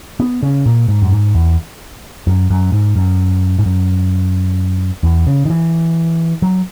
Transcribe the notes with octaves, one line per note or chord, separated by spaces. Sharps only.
B3
C#3
A#2
G#2
F#2
G#2
E2
F#2
F#2
G#2
F#2
G#2
F#2
E2
C#3
D#3
E3
F#3